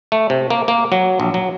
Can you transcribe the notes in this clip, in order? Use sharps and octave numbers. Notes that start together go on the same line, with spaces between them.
A3
C3
A#3
A#3
F#3
A#1
F#3